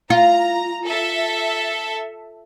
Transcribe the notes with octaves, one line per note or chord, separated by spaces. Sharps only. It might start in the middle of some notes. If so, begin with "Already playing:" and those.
F4 A#5
A4 E5